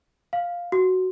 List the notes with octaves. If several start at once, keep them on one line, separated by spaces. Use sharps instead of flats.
F5
F#4